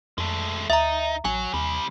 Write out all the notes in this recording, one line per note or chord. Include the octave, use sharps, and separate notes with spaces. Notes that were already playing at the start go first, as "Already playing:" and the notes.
F2 G#3 A3
D2 D#4 E5 A#5
A1 F#3 G#5
D#2 C3 G3